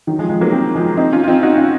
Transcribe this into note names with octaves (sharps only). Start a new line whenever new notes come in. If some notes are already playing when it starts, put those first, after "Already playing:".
D#3 F#3
F3 G#3
F3 G#3
F#3 A#3
G#3 C4
F3 G#3
C4 D#4
C#4 F4
F4
C4 D#4
D#4 F#4
C#4 F4